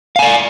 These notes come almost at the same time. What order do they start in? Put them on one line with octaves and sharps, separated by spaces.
F5 G#5 D5